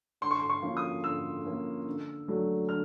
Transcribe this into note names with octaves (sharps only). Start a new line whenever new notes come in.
D3 C6
C#6
C6
C#6
F3 A#3 C#4
D#6
D3 E6
F3 A#3 C#4
D3
F#3 A3 D4
D3 F6